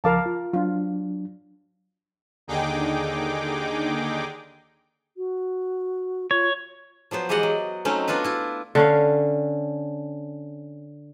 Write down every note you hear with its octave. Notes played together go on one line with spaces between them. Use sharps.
C#2 F3 A#4 F5 A5 D6
F4
F#3 D4 F4
D#2 D3 D#4 G#4 G5 D6
F#4
F4 C#5
F3 F#3 B3 C5
E3 G#3 G4 D5 D#5 F#5
F#3
F#3 A3 C4 C#4 D#4
B3 D4 F4 F#4 B4
E4 F4
D3 C#4 F5